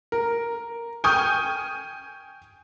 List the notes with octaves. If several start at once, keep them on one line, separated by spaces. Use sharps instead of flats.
A#4
G5 G#5 C#6 D#6 F6 G6